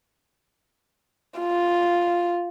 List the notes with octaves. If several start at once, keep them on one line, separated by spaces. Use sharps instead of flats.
F4